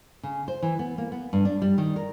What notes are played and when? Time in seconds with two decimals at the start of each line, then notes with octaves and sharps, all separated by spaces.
0.23 C#3
0.48 C5
0.63 E3
0.79 B3
0.98 A#3
1.12 B3
1.33 G2
1.45 D4
1.62 G3
1.78 D#3
1.96 A#4